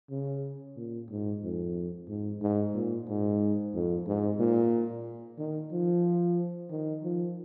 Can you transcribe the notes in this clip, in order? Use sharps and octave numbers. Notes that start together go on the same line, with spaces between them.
C#3
A#2
G#2
F2
G#2
G#2
A#2
G#2
F2
G#2
A#2
D#3
F3
D#3
F3